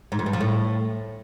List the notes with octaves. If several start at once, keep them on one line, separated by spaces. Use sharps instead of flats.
G#2
F2
G2
F3
A2